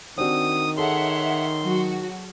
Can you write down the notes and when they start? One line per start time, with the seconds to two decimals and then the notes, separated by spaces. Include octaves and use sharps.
0.18 D#3 C4 D4 F#4 D#6
0.77 G#4 A4 C#5 E5 F#5 C6
1.63 F#3 F#4